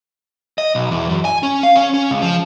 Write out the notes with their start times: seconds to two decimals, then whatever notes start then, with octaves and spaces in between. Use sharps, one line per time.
0.58 D#5
0.75 B1
0.91 E2
1.09 F#2
1.25 G#5
1.43 C#4
1.63 F5
1.76 C#4
1.94 C#4
2.10 C#2
2.22 F3